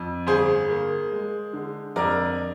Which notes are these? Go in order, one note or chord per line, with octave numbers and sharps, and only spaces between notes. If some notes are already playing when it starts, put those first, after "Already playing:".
Already playing: F2
G1 G#4 C5
A#3
G#3
D3
F2 A#4 D5